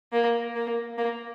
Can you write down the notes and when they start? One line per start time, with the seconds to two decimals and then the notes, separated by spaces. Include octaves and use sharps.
0.13 A#3
0.56 A#3
0.98 A#3